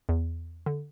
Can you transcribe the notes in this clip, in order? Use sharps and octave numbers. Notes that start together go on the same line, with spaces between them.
E2
D3